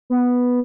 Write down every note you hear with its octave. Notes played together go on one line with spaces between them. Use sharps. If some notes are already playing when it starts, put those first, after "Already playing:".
B3